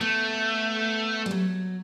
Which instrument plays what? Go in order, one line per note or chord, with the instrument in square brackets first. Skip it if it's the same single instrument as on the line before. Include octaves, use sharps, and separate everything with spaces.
[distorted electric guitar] A3 [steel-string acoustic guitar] B3
[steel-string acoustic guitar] G3
F#3